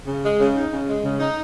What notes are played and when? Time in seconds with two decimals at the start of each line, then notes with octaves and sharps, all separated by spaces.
0.07 C#3
0.23 G#3
0.39 C#3
0.55 D#4
0.71 C#3
0.88 G#3
1.04 C#3
1.20 D#4